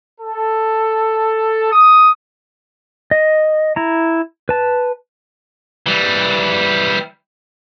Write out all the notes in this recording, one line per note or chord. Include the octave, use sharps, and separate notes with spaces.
A4
D#6
D#5
E4 A#5
B4 A5
E3 G3